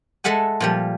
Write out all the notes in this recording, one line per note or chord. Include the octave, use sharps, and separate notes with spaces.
G#3 A4 E5 F#5 G#5
A#2 F3 G3